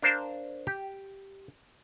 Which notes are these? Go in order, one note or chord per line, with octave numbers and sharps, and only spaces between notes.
D4 A#4 C5 F5 A5
G4